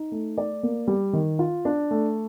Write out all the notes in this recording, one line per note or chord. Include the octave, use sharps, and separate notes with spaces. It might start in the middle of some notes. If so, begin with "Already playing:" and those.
Already playing: D#4
A3
D5
A#3
G3
D#3
F4
D4
A3